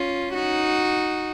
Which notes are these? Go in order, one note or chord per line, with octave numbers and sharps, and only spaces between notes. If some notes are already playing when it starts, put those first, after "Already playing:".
Already playing: C#4 F4
D#4 F#4